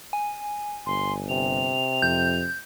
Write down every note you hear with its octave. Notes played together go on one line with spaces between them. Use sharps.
G#5
G1 C6
C3 F7
F2 G6